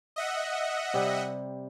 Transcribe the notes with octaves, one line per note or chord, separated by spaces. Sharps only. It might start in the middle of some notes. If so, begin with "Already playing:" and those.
D#5 E5 F#5
C3 G3